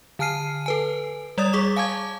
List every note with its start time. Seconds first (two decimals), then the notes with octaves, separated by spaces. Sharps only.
0.19 D3 G#5 A5 F6 C7 D#7
0.66 A4 B4 G#5
1.38 G3 C#5 D5 D#6 A6
1.53 G#4 C#6 D6
1.76 F5 G#5 A5 D6 G#6